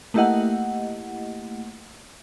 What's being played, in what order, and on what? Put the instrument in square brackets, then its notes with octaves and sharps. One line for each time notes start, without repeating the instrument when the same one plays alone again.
[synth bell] A3 A#3 E4 G4 D#5 F#5